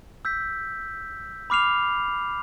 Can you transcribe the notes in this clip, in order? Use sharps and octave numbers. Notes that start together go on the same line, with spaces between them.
E6 G6 B6
B5 D6 F6 C7 F7